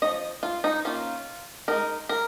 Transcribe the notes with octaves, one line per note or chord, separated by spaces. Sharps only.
F3 C#4 D#5
F4
D#4
D#3 A#3 C#4 F4
G#3 D#4 A#4
A#4